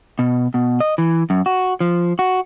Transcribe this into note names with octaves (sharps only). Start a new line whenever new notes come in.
B2
B2
D#5
E3
F#2
F#4
F3
F#4